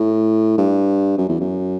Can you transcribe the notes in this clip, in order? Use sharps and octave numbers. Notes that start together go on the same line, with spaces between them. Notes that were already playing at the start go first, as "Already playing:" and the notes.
Already playing: A2
G2
F#2
E2
F#2